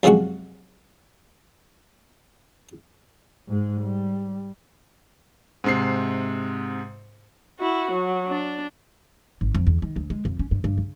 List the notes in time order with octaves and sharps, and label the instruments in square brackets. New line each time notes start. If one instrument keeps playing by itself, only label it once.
[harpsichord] F#2 C3 F3 G#3 F#4 C#6
[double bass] G#2 G#3
G3
[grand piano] G#2 C3 C7
[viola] E4 F#4
F#3
D4
[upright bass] G#1
F2
E2
D#3
D2
G#3
F2
C#4
G2
G2
C#3